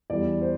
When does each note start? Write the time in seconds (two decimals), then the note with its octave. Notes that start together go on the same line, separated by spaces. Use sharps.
0.10 E2 E3 G3 D5
0.41 C5